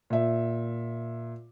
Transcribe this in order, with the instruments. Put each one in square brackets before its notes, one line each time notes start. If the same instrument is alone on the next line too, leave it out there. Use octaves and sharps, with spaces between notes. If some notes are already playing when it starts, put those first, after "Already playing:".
[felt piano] A#2 E5